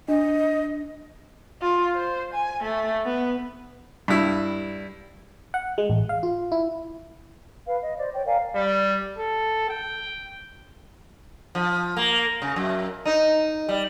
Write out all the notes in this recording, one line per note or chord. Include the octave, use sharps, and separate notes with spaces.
D4 D#5
F4
C5
G#5
A3
B3
G2 E4
F#5
G#3
A1
F5
F4
E4
B4 F5
D#5
C5 D5
C#5 G5
A#4 D5 F5 G#5
G3
A4
G5
F3
A#3
C#3
F#2
D#4
G3